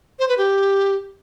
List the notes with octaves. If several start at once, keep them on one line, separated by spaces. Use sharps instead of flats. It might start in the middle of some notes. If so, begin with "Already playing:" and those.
C5
B4
G4